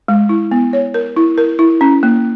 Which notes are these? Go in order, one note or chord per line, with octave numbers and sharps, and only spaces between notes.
G#3
E4
B3
C#5
A#4
E4
A#4
E4
C#4
A#3